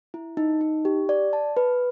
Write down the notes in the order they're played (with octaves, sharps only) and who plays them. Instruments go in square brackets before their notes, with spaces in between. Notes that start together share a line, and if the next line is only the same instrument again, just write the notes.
[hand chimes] E4
D#4
D#4
G4
D5
A5
B4